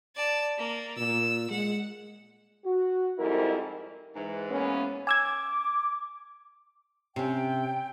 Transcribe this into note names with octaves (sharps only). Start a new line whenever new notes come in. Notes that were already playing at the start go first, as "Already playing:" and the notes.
D5 A5
A#3
A#2 E6
G#3 F#5
F#4
F2 G#2 G3 E4 A#4
G#2 E3
A#3 B3 C#4
G#5 D6 E6 G#6
C3 C#4 G5